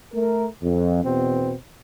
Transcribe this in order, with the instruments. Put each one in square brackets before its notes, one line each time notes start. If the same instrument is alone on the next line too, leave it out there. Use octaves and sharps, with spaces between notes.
[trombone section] A3 A#4
F2
E2 B2 B3 C4